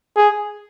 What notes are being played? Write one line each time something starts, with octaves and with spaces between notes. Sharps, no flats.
G#4